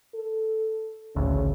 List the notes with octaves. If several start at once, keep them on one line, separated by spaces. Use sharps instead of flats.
A4
A1 D2 C#3